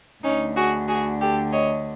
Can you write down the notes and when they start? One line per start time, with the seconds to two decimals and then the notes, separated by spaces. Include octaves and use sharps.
0.23 D2 D3 C#4 D#4
0.56 F#4 G#4
0.88 F#4 G#4
1.20 G4 A4
1.51 C#5 D#5